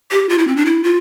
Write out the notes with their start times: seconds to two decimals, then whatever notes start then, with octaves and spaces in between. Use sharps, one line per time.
0.11 G4
0.29 F4
0.38 E4
0.47 C4
0.56 D4
0.66 E4
0.84 F4